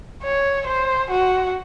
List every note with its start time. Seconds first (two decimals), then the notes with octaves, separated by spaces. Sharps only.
0.23 C#5
0.67 C5
1.11 F#4